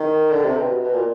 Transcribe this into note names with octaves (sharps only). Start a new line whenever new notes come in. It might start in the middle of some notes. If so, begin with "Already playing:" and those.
Already playing: D#3
D3
C3
B2
B2
A#2